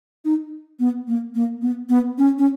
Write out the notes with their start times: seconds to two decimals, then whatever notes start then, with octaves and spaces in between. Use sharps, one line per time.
0.25 D#4
0.80 B3
1.08 A#3
1.35 A#3
1.62 B3
1.89 B3
2.18 C#4
2.39 C#4